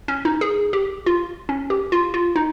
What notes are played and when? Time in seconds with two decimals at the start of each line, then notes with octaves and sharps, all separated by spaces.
0.08 C#4
0.25 D#4
0.41 G#4
0.73 G4
1.06 F4
1.49 C#4
1.70 G4
1.92 F4
2.14 F4
2.36 D#4